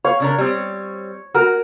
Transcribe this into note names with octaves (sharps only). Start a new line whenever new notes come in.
C#5 F5
C#3 D4 A#4
G3 C4
F#4 A#4